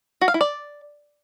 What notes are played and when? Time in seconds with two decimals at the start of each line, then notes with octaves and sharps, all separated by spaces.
0.21 F#4
0.28 F5
0.34 E4
0.41 D5